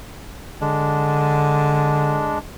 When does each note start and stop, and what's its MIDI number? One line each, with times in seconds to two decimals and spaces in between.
0.61 2.39 50
0.61 2.38 56
0.61 2.38 62